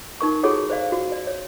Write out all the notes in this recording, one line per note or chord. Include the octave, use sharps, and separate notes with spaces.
D#4 A#4 C#6
E4 F#4 G#4 A4 C#5 F#5
C5 D5 F5
F#4
D5
C#5